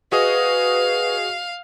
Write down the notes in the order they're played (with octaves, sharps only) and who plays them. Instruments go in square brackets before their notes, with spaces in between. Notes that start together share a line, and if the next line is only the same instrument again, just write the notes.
[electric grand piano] F#4 G#4 D#5 [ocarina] B4 [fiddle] F5